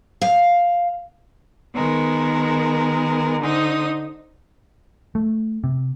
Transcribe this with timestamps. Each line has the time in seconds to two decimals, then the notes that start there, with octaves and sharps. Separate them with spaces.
0.22 F5
1.75 D#3 G#3 B3 A#4
3.41 D3 D#4 C5 D#6
5.15 A3
5.64 C3